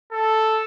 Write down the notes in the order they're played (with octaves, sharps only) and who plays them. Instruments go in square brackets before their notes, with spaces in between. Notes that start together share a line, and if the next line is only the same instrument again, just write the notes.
[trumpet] A4